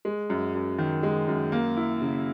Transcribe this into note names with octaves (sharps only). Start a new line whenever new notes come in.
G#3
F#2
F#2
D#3
G#3
F#2
A#3
E4
C#3